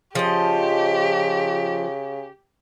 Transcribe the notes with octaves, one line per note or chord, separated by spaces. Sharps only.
C#3 F3 G4 D#5